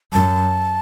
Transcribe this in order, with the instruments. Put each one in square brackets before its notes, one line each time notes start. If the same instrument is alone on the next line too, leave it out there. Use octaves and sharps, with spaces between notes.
[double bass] F#2 [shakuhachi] A5